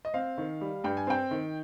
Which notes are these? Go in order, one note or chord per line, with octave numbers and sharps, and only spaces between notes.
D#5
C4 F5
D#3
G3
G2 G5
G#5
C4 G5
D#3